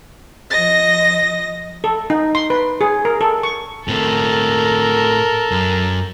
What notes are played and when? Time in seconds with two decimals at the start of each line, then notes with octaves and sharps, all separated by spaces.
0.51 F3 D#5 A#6
1.84 A4
2.10 D#4
2.35 C6
2.50 B4
2.81 G#4
3.05 A#4
3.21 A4
3.43 C#6
3.88 A2 C4 A4 A#4
5.52 F#2